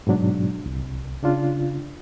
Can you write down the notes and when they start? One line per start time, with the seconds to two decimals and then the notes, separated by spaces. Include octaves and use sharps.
0.07 G#2 B2 F#3 D4
0.66 C2
1.23 C#3 D4 F4